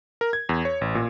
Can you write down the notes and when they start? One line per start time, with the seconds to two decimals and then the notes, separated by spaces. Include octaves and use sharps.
0.21 A#4
0.33 G#6
0.49 E2
0.65 C#5
0.81 A1
0.95 A#2